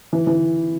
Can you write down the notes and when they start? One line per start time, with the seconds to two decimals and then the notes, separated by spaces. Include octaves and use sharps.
0.13 E3
0.27 E3